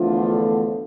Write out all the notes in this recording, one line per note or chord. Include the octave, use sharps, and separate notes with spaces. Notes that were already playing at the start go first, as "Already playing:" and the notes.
Already playing: E2 D3 F3 A3 F4